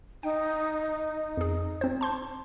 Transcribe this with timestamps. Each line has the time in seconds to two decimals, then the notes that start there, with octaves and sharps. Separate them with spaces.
0.23 D#4 G5
1.37 F2 G#4
1.81 C4 C5
2.01 A5 C6 G6